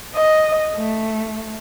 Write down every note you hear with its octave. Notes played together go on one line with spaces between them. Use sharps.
D#5
A3